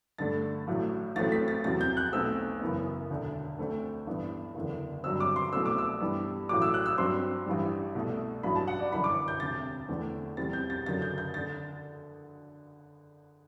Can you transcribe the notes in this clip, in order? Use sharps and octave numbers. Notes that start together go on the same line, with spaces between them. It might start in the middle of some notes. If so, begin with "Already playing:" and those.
G2 D3 A3 A6
A1 A2 F#3 A3
A1 A2 F#3 A3 C4 A6
B6
A6
E2 C3 F#3 A6
G6
F#6
B1 B2 A3 C4 E6
F#1 F#2 E3 B3
E1 D2 D3
D2 D3 A3 C4
A1 G2 E3 B3
F#1 E2 D3
G1 G2 F#3 C4 E6
D6
C6
C2 B2 F#3 A3 C4 E6
D6
E6
G2 E3 G3 B3
A1 A2 F#3 D6
E6
F#6
E6
G2 F#3 C4 C6
A1 G2 E3 G3
C2 B2 A3
A1 G2 F#3 B5
A5
F#5
D5
G1 F#2 E3 B5
D6
G6
E1 D2 C3 A6
E2 D3 A3 C4
E2 C3 G3 C4 A6
G6
A6
F#1 F#2 D3 F#3 A6
G6
G6
D3 A6